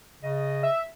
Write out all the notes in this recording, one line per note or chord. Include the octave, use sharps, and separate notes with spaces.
C#3 D#5
E5